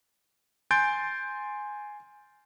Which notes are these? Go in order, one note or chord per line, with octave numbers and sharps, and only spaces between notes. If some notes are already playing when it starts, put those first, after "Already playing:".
G#5 C6 G6 A6 D7